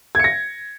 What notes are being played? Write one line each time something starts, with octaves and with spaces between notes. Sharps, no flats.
G#6 A#6 C#7